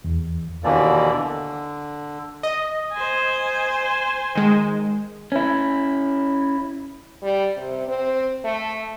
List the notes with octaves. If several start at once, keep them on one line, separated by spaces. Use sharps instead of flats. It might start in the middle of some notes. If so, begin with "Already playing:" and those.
E2
D#2 B2 D3 E3 A#3 D5
D3
D#5
C5 G#5
D#3 G#3
C#4 E4
G3
C3
C4
A3